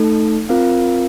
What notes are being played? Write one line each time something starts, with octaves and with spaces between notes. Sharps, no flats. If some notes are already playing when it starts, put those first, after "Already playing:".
Already playing: A3 D#4 A4
C4 F4 A#4 F5